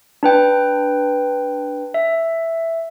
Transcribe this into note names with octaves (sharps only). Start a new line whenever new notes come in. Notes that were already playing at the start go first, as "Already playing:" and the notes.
D4 B4 G5
E5